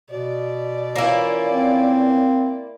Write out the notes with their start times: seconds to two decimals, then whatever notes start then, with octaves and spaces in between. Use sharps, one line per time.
0.10 B2 D5
0.96 E3 A#3 C#4 E4 F4
1.51 C4